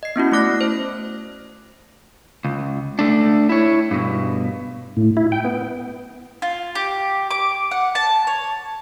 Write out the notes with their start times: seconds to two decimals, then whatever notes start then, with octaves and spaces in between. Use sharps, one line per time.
0.03 D#5 C7
0.16 B3 C#4 E4 F#4
0.32 A3 E4 D6 F#6 A#6
0.61 C5
2.44 C#2
2.99 A3 D4
3.49 E4 C#5
3.91 G2 B2
4.97 A2
5.17 E4
5.32 G5
5.45 B3
6.42 F4
6.75 G4
7.31 D6
7.71 F#5
7.95 A5
8.27 C#5